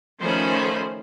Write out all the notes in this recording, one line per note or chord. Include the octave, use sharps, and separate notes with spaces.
D#3 F3 A3 C#4 C5 B5